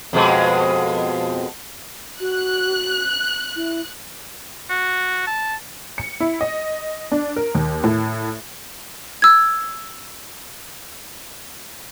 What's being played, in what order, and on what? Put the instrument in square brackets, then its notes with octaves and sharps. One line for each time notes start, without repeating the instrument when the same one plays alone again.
[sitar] F2 B2 G#3
[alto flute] F#4 [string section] F#6
[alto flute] E4
[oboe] F#4
A5
[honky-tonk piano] C#7
E4
D#5
D4
A#4
D#2
A2
[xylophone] E6 G#6